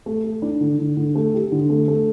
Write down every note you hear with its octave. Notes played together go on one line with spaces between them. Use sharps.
A3
A3
D4
D3
D3
D3
A3
G4
D3
A3
A3